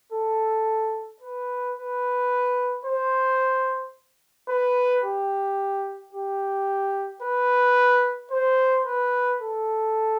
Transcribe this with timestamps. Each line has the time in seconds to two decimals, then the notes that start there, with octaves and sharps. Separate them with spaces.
0.12 A4
1.21 B4
1.76 B4
2.85 C5
4.49 B4
5.04 G4
6.13 G4
7.22 B4
8.31 C5
8.86 B4
9.41 A4